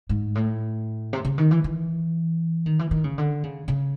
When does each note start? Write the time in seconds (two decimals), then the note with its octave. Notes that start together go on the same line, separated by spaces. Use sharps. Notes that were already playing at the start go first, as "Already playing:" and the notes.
0.09 G#2
0.35 A2
1.13 C3
1.25 C#3
1.38 D#3
1.51 E3
1.64 E3
2.66 D#3
2.79 E3
2.91 D#3
3.04 C#3
3.18 D3
3.43 C#3
3.68 C#3